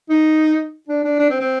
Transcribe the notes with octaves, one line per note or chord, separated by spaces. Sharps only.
D#4
D4
D4
D4
C4
C4